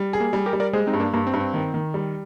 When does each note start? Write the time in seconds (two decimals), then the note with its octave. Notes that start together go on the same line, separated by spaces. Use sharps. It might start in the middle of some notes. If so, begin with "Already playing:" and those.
Already playing: G3
0.13 G#4
0.20 A#3
0.33 G3
0.46 G4 A#4
0.53 G3
0.60 A#4 D5
0.73 G#3 G#4 C5
0.87 C4 D#4
0.93 G2
1.00 A#3 D4
1.13 G2 A#3
1.27 C4
1.34 G2
1.40 C4
1.54 D#3
1.74 D#3
1.94 G3